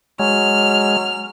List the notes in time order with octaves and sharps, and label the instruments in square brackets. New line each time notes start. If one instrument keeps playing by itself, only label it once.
[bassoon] F#3 [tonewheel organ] G#3 [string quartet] F6